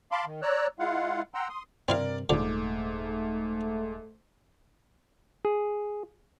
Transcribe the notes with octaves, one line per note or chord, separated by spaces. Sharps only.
F5 A5 B5 C6 D6
D#3
C#5 D5 A#5 E6 F#6
G#3 E4 F4 F5 F#5
F#5 G5 A#5 C6 E6
C6 D#6
G2 C3 C4 E4 A#4 D5 F5
D#1 G#2 D3 F3 A3 D6
G#4